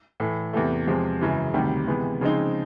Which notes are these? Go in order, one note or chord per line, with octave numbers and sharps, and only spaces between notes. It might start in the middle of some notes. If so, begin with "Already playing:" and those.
A2 E3 A3
E2 C3 E3 A3
E2 C3 F3 G#3
F#2 C#3 E3 G#3
D2 C3 D#3 G3
C3 E3 G#3 B3
C#3 F3 G#3 C4 D#4